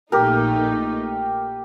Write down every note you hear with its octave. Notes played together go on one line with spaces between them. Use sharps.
A#1 A#2 A3 D#4 G4 A#4